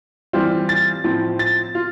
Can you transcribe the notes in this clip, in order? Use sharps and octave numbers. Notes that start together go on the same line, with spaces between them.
E3 G3 C4 F4
A6
A2 F3 C4
A6
F4